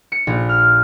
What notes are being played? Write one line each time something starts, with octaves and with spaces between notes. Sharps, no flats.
C#7
A#1
F6